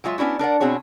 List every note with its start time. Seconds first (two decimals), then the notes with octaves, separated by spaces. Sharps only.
0.04 F#3 G#3 F4 E5
0.18 B3 C#4 D4 E4 F#4
0.39 D4 A#4 D5 F#5
0.60 B2 C4 F#4 G#4 C#5